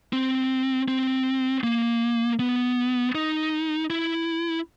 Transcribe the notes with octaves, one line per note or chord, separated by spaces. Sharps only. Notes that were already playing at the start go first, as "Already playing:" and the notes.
C4
C4
A#3
B3
D#4
E4